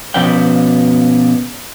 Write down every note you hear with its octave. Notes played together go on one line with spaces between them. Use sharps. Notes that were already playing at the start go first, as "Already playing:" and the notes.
B2 F3 C#4 B4 D5 G5